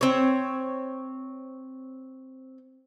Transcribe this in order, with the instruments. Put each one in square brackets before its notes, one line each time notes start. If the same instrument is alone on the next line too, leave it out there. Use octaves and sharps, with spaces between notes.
[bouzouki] C4 C#5